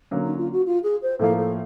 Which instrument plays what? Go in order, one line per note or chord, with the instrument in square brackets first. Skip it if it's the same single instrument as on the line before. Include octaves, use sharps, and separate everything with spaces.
[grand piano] D3 F#3 A#3 C#4
[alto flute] D#4
F4
F#4
F4
G#4
C5
[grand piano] A2 F3 A#3 [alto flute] A4
[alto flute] A4